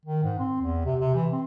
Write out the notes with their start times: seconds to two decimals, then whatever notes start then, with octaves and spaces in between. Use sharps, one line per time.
0.06 D#3
0.24 G#2
0.39 C4
0.61 E2
0.85 C3
0.99 C3
1.14 E3
1.32 C4